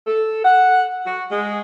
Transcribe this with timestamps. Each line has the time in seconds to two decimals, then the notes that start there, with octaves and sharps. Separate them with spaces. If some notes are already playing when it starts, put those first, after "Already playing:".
0.07 A4
0.43 F#5
1.05 F#4
1.30 G#3